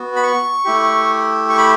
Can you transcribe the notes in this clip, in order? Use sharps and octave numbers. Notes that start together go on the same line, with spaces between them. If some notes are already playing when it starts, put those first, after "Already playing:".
Already playing: B3 F#4
B5
C#6
A3 E4 G4
C#6
B5